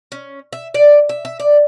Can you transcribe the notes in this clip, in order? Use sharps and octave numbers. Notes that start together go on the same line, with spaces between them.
C#4
E5
D5
E5
E5
D5